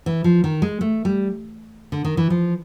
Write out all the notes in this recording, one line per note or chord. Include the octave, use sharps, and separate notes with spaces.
E3
F3
D#3
G#3
A3
G3
D3
D#3
E3
F3